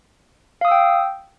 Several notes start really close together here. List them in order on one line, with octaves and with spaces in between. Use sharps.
F5 D#6 E6 G5